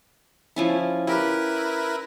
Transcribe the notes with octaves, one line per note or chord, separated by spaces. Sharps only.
F3 C#4 E4
E4 G4 A#4 B4